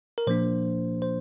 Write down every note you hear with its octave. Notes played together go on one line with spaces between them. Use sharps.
A#4
A#2 F3 A#3 D4 C5
C5